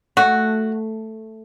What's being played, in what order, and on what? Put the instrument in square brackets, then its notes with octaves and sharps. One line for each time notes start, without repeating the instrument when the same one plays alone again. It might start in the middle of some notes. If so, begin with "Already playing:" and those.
[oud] A3 [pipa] F#4